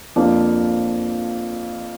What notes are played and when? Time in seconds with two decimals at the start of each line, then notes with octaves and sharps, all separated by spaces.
0.16 F2 F3 A#3 D4